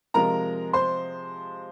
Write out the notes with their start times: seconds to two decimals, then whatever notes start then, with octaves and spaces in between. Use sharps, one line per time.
0.14 C3 F3 G#3 A#4 A#5
0.73 C5 C6